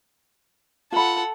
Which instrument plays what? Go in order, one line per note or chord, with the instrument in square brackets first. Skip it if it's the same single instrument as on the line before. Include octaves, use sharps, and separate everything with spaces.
[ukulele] F4 B5 [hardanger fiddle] A4 F#5